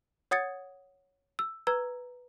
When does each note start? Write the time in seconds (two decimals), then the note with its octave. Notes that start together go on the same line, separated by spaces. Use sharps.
0.31 C#5 F#5 D#6 G#6 A6 C#7
1.39 E6
1.67 B4 A#5 E6 G#6